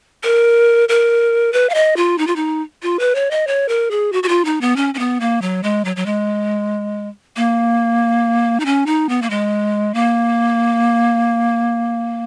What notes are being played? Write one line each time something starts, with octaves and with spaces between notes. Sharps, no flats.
A#4
A#4
B4
F5
D#5
F4
D#4
F4
D#4
F4
B4
C#5
D#5
C#5
A#4
G#4
F#4
F#4
F4
D#4
B3
C#4
C#4
B3
A#3
F#3
G#3
F#3
F#3
G#3
A#3
D#4
C#4
D#4
B3
A#3
G#3
A#3